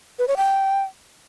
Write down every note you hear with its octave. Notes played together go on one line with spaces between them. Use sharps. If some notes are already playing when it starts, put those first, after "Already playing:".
B4
C#5
G5